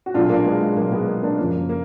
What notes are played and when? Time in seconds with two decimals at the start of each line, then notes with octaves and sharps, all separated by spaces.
0.06 F#4
0.14 B1 A#2 F#3 D4 F4
0.29 A#3 D4
0.45 G#3 B3
0.61 G#3
0.76 B1 A#2 F#3 A#3
0.92 G#3 B3
1.07 A#3
1.23 A#3 D4
1.38 F#1 F#2 F3 A#3
1.69 A#3